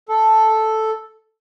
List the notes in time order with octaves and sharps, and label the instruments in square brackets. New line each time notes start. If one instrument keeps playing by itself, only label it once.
[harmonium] A4